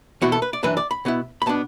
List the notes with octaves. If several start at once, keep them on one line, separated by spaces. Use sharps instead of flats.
E2 B2 B3 E4 F#4
A4
B4
D5
F#2 E3 D4 B4
D5
B5
B2 B3 E4
B5
B2 B3 D4 A5